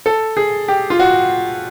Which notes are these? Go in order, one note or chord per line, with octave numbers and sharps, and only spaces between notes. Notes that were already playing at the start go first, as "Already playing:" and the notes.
A4
G#4
G4
F4
F#4